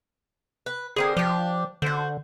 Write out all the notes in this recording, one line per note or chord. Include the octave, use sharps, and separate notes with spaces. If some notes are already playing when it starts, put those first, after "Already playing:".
B4
D3 C4 G#4 A#4
F3 D4 G4
D3 F#4 C5